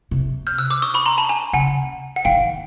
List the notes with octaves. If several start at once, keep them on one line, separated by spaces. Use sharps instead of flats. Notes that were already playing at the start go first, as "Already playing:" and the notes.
C3
F6 G6
E6 F#6
D6 E6
C#6 D#6
B5 C#6
A#5 C6
A5 B5
G#5 A#5
C#3 F#5 G#5
F#5
D#3 F5 G5